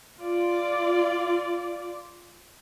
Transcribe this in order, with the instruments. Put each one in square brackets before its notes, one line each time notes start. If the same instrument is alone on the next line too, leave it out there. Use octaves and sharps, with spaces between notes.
[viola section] F4 D5